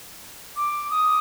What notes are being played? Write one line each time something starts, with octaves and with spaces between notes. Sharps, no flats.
D6
D#6